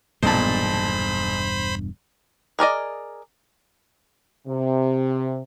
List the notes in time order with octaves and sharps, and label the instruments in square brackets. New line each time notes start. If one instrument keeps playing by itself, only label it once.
[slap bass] E1 G2 G#3 [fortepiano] B1 A#2 A5 [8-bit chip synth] C5 B5
[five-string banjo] G#4 A#4 D5 D#5
[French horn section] C3